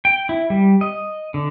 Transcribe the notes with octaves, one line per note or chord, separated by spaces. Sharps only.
G5
E4
G3
D#5
D3